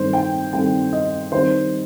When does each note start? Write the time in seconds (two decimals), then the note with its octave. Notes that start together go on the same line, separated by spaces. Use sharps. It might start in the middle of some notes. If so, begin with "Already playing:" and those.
Already playing: G2 D#3 A3 C4 C5
0.13 G5
0.53 G2 D#3 A3 C4 G5
0.93 D#5
1.32 D#3 G3 C4 C5